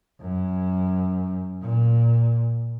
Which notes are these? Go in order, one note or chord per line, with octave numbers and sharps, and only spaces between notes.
F#2
A#2